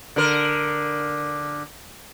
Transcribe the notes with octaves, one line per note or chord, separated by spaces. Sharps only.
D3 A#4